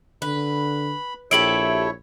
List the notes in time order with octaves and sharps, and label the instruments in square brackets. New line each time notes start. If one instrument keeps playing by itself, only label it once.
[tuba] D3 [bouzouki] B4 [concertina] B5
[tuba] A#1 [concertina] E4 C#5 [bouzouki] G4 A4 E5 [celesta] D7 F#7